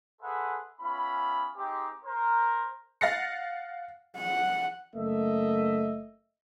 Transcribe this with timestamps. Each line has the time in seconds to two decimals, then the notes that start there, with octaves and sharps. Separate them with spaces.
0.22 G#4 A4 B4 C5 E5 F#5
0.81 B3 C#4 F4 E5 B5
1.57 G#3 C4 D#4 G4
2.04 A#4 C5
3.01 F5 F#5 A6 A#6 C7 C#7
4.17 F#5
4.95 F#1 A3 A#3 D#5 E5